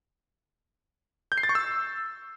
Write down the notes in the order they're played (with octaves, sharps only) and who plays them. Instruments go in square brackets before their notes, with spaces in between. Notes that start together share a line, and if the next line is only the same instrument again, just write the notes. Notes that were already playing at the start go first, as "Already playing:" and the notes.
[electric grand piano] G6
C7
A6
C#6
E6